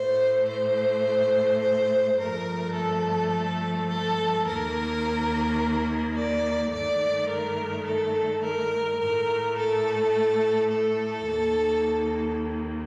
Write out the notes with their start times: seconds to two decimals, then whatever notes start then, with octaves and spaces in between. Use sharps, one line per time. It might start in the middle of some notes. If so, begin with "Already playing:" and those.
Already playing: A2 A3 C5
0.48 C5
1.61 C5
2.18 G2 F3 A3 A#4
2.75 A4
3.88 A4
4.45 D#2 D#3 A#3 A#4
6.16 D5
6.72 G2 D#3 A3 D5
7.29 A#4
7.86 A4
8.42 A#4
9.00 A2 A3 A#4
9.57 A4
10.71 A4
11.27 D#2 D#3 A#3